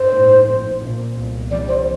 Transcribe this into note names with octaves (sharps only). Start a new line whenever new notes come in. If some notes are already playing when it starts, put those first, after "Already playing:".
Already playing: G2 C5
A2
A#1
A#2
C2
E3 D5
C5